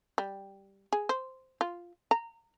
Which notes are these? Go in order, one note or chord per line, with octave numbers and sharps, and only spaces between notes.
G3
G#4
C5
F4
A#5